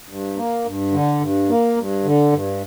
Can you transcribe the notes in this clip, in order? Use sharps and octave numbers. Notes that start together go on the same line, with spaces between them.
G2
A#3
G2
D3
G2
A#3
G2
D3
G2